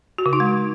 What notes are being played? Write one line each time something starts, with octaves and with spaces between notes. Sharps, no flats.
F#4
C#3
D#4
G#3